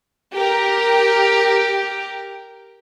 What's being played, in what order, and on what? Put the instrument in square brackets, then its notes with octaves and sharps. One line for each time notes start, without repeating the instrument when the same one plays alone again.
[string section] G4 A#4